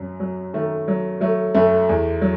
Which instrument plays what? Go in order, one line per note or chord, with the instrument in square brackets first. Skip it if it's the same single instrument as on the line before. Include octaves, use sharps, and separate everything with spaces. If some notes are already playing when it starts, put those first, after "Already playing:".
Already playing: [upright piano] F#2 F#3
F#3
D#3 A3
F#3
F#3 A3
F#2 A3
E2
F#3